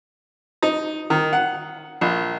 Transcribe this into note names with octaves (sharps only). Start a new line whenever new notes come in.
D#4
D#3
F#5
A#1